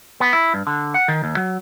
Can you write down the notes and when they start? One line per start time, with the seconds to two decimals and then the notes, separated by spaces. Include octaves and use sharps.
0.20 B3
0.33 E4
0.54 G2
0.67 D3
0.94 F#5
1.08 D#3
1.24 D#2
1.37 F#3